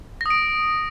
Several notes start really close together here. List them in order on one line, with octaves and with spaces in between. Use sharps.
A#6 D#6 D7